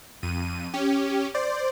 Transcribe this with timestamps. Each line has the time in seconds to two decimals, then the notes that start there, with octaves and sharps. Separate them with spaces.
0.23 F2 D#7
0.74 C#4 G4
1.34 C5 D5